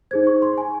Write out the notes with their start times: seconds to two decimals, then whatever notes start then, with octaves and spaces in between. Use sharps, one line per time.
0.11 D#4 G#4 C5 G#6
0.27 C#6
0.42 C6
0.58 G#5